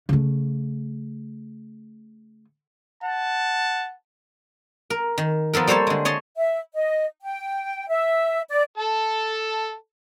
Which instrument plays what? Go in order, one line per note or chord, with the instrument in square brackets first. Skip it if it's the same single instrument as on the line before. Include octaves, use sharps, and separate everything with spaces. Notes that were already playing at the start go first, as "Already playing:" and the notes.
[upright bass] C#3 A3
[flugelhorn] F#5 [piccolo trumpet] A5
[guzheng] A#4
D#3
F3 B3 A4 A#4
G3 A#3 A4 C5 C#5 A5
D3 G#3
C#5 D#5 A5 C6
[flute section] E5
D#5
G5
E5
D5
[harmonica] A4 A5